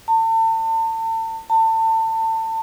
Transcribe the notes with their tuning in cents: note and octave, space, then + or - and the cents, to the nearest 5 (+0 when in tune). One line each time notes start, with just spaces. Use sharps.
A5 +40
A5 +30